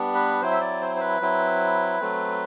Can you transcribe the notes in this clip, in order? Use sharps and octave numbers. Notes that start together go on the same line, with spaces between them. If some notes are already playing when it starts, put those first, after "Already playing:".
Already playing: G3 B3 D4
B4
F#3 C4 E4 C5
E5
D5
C5
C5
B4
F#3 C4 E4
F#3 A3 C4